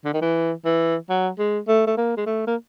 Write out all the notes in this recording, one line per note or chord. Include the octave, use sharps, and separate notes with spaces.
D3
D#3
E3
E3
F#3
G#3
A3
A3
A#3
G#3
A3
A#3